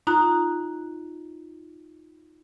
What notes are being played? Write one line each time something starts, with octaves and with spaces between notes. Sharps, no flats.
D#4 F4 A#5 D#6 F#6